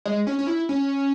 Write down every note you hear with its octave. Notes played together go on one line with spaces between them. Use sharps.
G#3
C#4
C#4
E4
C#4